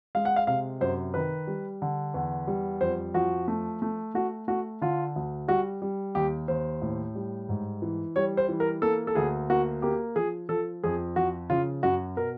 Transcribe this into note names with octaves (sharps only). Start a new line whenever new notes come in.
G#3 F5
F#5
F5
C3 F5
F#2 C5
D#3 B4
G3
D3
E2
G3
F2 C5
F3 F#4
A3
A3
A3 F#4
A3 F#4
D3 F4
D2
G3 F#4
G3
D#2 G4
D#2 C5
A2
G3
G#2
E3
G3 C#5
C5
E3
A#4
A#3 A4
A4
D2 G#4
A#3 F#4
A#3 G4
F3 G#4
F3 A4
F2 G#4
F3 F#4
C#3 F4
F#2 F#4
B2 A#4